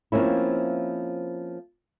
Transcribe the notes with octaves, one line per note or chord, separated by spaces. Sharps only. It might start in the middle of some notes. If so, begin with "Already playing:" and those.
F3 A#3 C4 C#4 E4